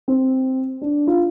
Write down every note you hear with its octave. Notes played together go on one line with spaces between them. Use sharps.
C4
D4
F4